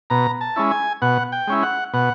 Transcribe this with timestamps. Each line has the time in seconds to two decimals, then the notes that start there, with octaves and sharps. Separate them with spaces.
0.10 B2 A#5
0.41 A5
0.56 G#3 C#4 E4
0.71 G#5
1.02 B2 F#5
1.32 G5
1.47 G#3 C#4 E4
1.63 F#5
1.94 B2 F#5